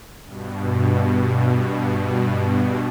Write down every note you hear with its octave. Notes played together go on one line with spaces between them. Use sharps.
G2 B2